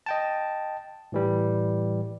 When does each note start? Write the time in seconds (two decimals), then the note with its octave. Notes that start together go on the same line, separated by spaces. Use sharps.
0.06 D#5 G5 A5
1.12 A2 E3 G3